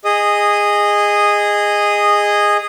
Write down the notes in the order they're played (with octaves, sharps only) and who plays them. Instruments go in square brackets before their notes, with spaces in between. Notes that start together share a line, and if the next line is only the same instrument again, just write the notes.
[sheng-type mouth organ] G#4 D#5 D#6